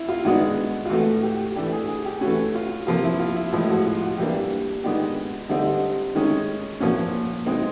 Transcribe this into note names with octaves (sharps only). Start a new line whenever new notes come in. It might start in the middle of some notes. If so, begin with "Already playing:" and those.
Already playing: E4
F4
D#3 G#3 B3 D4 F#4
F4
A2 E3 A3 F#4
G4
E3 A3 D4 G4
G#4
G#4
G4
E3 A3 C#4 F#4
F4
C3 F3 A#3 F4
E4
F4
E4
A2 F3 G#3 F4
F#4
F4
F#4
E3 G3 A#3 D4 G4
D#3 G#3 B3 D4 G4
D3 G3 C4 D#4
D#3 G#3 C#4
A#2 F3 A#3 C#4 F#4
B2 G#3 C4 D#4